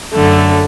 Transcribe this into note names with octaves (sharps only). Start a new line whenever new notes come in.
F#2 D3 A3